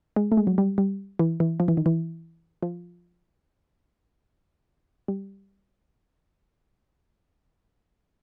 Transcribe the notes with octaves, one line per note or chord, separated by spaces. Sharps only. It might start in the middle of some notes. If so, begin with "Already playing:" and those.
G#3
A3
G#3
F#3
G3
G3
E3
E3
F3
E3
D#3
E3
F3
G3